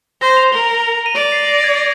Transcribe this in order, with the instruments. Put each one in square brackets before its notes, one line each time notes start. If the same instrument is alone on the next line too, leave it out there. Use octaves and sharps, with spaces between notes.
[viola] C5 [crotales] A#6
[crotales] F7
[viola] A#4 [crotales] G7
[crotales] F7
F7
D#7
[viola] D5 [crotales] D7
[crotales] C7
A#6
G#6
A#6